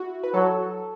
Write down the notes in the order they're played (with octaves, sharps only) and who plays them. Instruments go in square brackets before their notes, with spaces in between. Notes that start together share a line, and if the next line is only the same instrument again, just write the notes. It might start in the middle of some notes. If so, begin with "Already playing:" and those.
Already playing: [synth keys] E4 F#4
B4
[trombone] F#3 [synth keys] A4